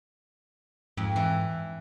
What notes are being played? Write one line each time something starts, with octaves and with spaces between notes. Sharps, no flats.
F2 G#2
E3